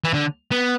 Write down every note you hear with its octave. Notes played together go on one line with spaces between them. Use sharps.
E3
D3
B3